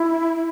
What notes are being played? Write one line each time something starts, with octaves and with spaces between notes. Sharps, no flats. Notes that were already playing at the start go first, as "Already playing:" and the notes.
Already playing: E4